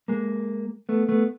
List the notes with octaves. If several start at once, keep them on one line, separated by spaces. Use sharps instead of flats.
G#3 A#3
A3 B3
A3 B3